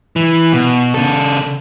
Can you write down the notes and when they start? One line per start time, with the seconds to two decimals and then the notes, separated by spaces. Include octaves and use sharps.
0.16 E3
0.53 B2
0.94 C#3 A4